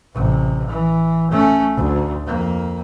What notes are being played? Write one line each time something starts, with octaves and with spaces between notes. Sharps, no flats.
A1 C3
E3
A3 C#4
D2
F2 A#3